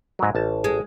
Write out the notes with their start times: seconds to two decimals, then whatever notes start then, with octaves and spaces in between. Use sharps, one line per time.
0.19 G#2 F#3
0.35 A1 A5
0.64 G#3